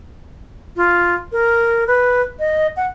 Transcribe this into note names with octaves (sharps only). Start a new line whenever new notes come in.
F4
A#4
B4
D#5
F#5